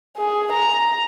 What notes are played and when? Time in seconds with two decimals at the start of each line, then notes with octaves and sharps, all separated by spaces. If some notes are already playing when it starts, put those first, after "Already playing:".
0.17 G#4
0.52 A#5